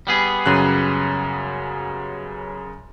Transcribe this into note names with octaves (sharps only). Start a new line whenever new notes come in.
G3 B3 G#4
F#2 C#3 F#6